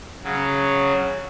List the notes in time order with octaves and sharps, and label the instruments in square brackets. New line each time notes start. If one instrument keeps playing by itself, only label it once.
[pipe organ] C#3 F#3